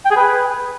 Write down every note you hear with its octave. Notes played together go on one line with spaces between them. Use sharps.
G5
G#4
B4